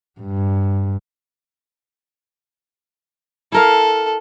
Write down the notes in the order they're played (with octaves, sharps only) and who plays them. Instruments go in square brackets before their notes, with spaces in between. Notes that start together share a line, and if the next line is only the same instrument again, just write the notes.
[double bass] G2
[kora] E4 A#4 F5 [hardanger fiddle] A4